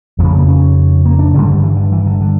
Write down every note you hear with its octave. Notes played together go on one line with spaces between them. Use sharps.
F2 C#3 F3
A3
A#3
C#4
A#3
D4
G2 D3 G3 C#4
A3
G3
E3
D3
E3
D3
D3